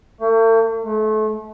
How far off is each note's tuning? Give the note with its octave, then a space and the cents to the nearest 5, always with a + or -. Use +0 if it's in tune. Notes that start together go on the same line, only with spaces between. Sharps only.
A3 +45
A3 -30